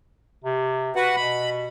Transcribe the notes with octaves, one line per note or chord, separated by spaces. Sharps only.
C3
F#4 B4 F#5
B2 B5